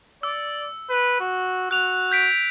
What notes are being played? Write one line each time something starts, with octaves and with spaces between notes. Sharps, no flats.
D5 E6
B4
F#4
F#4 F#6 F7
G6 B6 D7